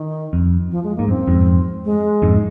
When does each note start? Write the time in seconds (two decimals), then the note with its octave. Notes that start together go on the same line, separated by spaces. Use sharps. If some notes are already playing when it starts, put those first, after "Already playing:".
Already playing: D#3
0.33 F2
0.71 F3
0.84 G#3
0.96 G#2 A#3
1.08 F#2 C4
1.27 F2 G#2
1.85 G#3
2.22 F2 G#2